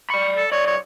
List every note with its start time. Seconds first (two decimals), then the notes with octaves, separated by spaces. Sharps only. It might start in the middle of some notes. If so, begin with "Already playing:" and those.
0.10 D5 B5 C#6
0.36 A4
0.52 B1 C#5 D5
0.67 C#5